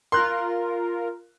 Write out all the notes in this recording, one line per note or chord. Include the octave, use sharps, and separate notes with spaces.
F4 A#4 C6 F#6